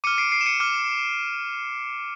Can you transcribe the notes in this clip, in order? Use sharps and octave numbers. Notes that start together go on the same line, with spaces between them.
D6 F6 C#7 D#7
C7 D7
C7 D7
E7
C#7 D#7
D6 F6